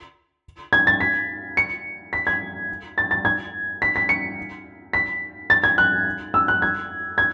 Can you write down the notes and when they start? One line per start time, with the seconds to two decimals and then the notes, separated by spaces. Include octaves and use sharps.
0.73 G#6
0.87 A6
1.00 B6
1.57 C#7
2.13 B6
2.27 G#6
2.98 A6
3.11 A6
3.25 G#6
3.82 B6
3.96 B6
4.09 C#7
4.93 B6
5.50 A6
5.64 G#6
5.78 F#6
6.34 E6
6.48 F#6
6.62 G#6
7.18 G#6